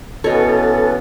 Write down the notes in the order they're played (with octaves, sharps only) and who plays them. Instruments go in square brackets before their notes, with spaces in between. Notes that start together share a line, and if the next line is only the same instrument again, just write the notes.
[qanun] B2 C#5 [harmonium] E3 B3 C#4 [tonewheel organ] A4